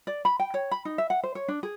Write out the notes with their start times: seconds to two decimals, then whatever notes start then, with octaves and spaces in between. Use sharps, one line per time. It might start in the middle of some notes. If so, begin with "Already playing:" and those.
0.07 D5
0.25 B5
0.40 G5
0.54 C#5
0.71 B5
0.85 D#4
0.98 E5
1.10 F#5
1.23 C5
1.35 C#5
1.48 D4
1.63 G#4